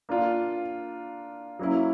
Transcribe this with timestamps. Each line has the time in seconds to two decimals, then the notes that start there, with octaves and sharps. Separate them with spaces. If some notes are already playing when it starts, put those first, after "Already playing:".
0.09 A#3 D4 F4
1.59 F#3 A#3 C#4 E4